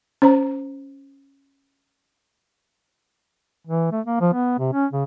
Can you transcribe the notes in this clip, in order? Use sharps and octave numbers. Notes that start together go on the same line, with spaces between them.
C#4 C5 A#5
E3
A3
A#3
F3
B3
C3
C#4
C#3